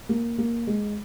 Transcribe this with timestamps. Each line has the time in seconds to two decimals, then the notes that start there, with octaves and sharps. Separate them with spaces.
0.09 A#3
0.38 A#3
0.67 G#3